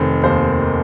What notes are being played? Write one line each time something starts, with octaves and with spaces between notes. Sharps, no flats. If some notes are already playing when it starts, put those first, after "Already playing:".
Already playing: F1 D#3 C5
D#2 C5